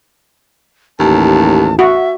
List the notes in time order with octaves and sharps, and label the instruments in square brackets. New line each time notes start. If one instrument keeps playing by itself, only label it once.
[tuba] A1 [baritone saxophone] D#2 [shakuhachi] A5
[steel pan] F#4 [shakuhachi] E5